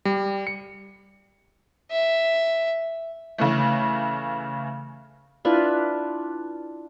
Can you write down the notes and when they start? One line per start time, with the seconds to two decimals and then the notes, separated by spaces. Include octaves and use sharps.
0.05 G3
0.47 C#7
1.91 E5
3.38 C#3 E3 A3
5.45 D4 E4 F4 B4